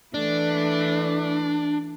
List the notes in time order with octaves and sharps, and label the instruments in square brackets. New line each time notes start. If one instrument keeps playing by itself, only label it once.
[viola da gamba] E3 A3 E4 [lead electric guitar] D4